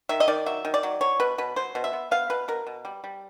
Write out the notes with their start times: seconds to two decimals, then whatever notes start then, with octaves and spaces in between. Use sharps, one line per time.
0.09 D#3 E5
0.20 D#5
0.28 D#3 D5
0.46 F#3 E5
0.65 D#3
0.74 D5
0.83 F#3
1.01 F#3 C#5
1.20 B2 B4
1.38 B2 B4
1.56 F#3 C5
1.75 B2
1.84 E5
1.93 B3
2.11 B3 F5
2.30 B2 B4
2.48 B2 A#4
2.67 B2
2.85 G3
3.04 G3